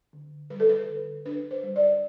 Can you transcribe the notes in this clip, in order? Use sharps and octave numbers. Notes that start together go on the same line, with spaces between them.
D3
G3 B4
A4
B4
D3
D4 B4
C5
G3
D5